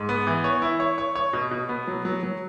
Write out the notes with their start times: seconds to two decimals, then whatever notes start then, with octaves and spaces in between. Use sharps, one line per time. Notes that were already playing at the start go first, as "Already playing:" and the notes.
Already playing: G#2
0.09 B3
0.27 E3
0.44 C#5
0.62 E4
0.80 C#5
0.98 C#5
1.15 C#5
1.33 B2
1.51 B2
1.69 B3
1.87 F#3
2.05 F#3
2.23 F#3